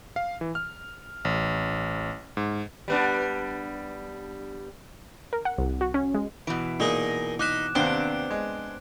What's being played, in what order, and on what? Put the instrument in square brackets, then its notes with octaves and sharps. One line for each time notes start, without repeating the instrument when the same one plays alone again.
[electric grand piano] F5
E3
F6
A1
G#2
[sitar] G3 B3 D4
[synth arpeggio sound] A#4
F#5
C2
F#4
C#4
G#3
[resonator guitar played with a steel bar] B2 E3 [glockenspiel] D7
[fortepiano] A#2 [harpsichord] D#4 G#4 A#4
[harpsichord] D#4 B5 [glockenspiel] D6 F#6 E7
[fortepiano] D#2 C3 [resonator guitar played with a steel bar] B3 C4 D4 [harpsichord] C5 [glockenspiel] D7
[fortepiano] G#3